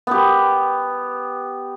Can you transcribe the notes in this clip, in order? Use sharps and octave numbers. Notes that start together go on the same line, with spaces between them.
B3 G4